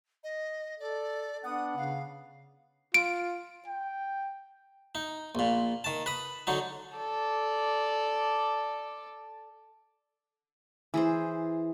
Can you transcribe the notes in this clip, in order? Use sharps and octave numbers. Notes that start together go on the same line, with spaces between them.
D#5
A4 D5
B3 D4 F#5 D#6
C#3 F5
F4 D7
G5
D#4
A#1 A#2
D#3 A5
B4 B5 D#6
D3 F#3 D#4
A4 D5
E3 G#4 C5